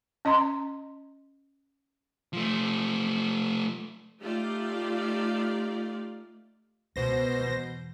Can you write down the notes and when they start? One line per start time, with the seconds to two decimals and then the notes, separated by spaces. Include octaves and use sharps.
0.25 C#4 D#5 A#5 C6
2.33 F3 A3
4.20 A3 D#4 F4 G4 D5 F5
6.96 C#2 B2 C5 A#6
7.40 E1 E3